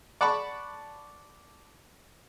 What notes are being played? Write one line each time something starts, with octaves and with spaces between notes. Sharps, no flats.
D5 F#5 A5 B5 C#6 D6